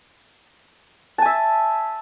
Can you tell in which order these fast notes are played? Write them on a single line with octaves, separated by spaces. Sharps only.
A5 G#5 E5